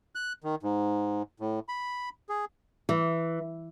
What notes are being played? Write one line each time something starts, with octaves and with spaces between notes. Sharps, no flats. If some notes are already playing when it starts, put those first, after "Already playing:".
F#6
D#3
G#2
A2
B5
G#4
E3